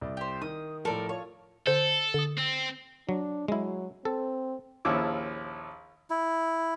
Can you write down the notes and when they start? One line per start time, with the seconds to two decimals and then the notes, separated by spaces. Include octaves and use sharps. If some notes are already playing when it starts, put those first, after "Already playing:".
0.01 C2 D5
0.17 G4 C5
0.42 D#3 D#6
0.85 A2 F3 A4 A#4 D5
1.09 F4 C#5
1.67 D3 A4 C5 G6
2.14 D3 D#6
2.38 C4
3.09 F#3 D4
3.48 F#3 G#3 E4
4.05 C4 A4
4.85 A#1 D#2 F3 C#4 E4 D6
6.10 E4